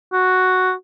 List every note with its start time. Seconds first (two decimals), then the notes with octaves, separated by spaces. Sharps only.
0.13 F#4